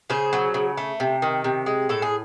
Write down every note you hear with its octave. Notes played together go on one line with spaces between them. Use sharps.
C#3 G#4 C5
F#3
C#3
A3
C3
D#3
C3
G#3
A2 A4
G#4